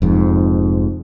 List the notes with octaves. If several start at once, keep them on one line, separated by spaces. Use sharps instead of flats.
F1 F2 G#2